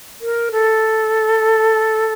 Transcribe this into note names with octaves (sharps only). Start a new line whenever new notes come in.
A#4
A4